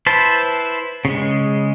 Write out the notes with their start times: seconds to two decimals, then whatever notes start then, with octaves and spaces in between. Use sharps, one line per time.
0.06 E4 B4 C5 A5
1.05 C#3 G#3